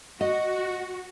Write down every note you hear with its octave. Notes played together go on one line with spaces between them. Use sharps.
F#4 D#5